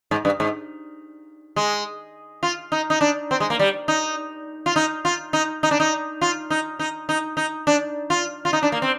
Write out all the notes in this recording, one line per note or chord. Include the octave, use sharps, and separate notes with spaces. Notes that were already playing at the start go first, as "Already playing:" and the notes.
G#2
G2
G#2
G#3
F4
D#4
D#4
D4
C4
G#3
A#3
G3
D#4
F4
D#4
F4
D#4
D#4
D4
D#4
F4
D#4
D#4
D#4
D#4
D4
F4
F4
D#4
D4
A#3
C4